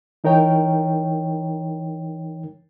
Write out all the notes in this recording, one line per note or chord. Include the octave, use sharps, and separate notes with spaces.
E3 D#4 A#4 C#5 G5